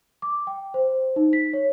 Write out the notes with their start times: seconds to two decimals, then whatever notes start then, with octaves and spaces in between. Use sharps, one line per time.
0.22 D6
0.47 G5
0.74 C5
1.16 D#4
1.33 B6
1.53 C#5